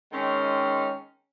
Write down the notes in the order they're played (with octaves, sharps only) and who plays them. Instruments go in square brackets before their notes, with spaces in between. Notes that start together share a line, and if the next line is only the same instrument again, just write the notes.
[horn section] D#3 G#3 C4 C#4